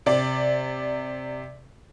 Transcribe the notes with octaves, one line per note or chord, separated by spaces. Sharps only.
C3 D5